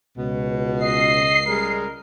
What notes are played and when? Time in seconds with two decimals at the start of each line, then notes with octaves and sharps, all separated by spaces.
0.17 C#2 B2
0.83 D#5 C7
1.48 G3 G#3 A#4